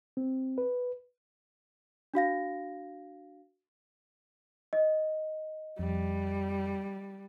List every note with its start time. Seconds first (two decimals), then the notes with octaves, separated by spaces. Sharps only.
0.17 C4
0.58 B4
2.14 D4 F#4 F5 A#6
4.73 D#5
5.79 F2 G3